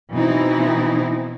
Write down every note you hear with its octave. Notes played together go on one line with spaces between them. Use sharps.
B2 E3 C4 D#4 E4